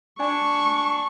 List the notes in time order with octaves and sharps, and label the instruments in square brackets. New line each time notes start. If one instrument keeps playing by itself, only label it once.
[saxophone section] D4 [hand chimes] G#5 [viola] C#6